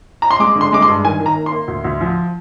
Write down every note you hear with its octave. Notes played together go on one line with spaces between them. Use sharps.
A#5
C6
G#3 D6
D3
C6
G#3 D6
C6
G2
D#3 G#5
D#3
A#5
A#3
C6
A#3
D2
D2
F3